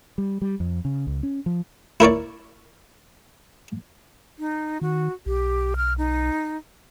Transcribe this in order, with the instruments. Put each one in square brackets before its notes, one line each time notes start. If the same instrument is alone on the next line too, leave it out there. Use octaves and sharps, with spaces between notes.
[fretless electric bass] G3
G3
F2
C#3
C#2
C#4
F3
[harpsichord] E4 A#4 C#5 D5
[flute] D#4
[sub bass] D#3 [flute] F#4
[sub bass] B1 [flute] G4
[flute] F6
D#4